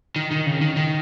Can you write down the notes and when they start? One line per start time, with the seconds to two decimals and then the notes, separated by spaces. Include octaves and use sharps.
0.16 D#3
0.31 D#3
0.46 C#3
0.61 D#3
0.77 D#3